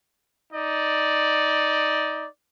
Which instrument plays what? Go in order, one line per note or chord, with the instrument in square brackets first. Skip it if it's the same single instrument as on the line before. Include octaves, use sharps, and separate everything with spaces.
[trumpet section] D#4 D5